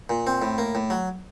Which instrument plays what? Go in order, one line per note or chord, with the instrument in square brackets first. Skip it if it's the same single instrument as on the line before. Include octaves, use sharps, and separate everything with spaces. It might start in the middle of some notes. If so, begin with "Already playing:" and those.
[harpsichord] A#2
C4
A2
A#3
A2
F#3